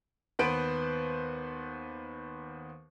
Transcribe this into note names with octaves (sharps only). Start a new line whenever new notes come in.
D#2 B3 B4 C5 F#6 D7